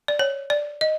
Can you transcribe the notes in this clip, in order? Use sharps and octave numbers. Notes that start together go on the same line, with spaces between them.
D5
C#5
D5
D#5